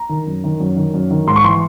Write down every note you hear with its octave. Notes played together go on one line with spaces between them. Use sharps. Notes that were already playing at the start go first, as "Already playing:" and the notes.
Already playing: A#5
D#3
F#2
D#3
F#2
D#3
F#2
D#3
G#2 C6
C#6
E3 C6